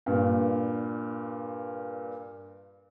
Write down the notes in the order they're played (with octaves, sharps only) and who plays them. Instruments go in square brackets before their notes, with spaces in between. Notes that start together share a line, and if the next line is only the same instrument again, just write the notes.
[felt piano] G2 A#2